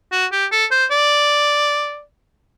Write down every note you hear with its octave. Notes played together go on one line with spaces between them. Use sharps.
F#4
G4
A4
C5
D5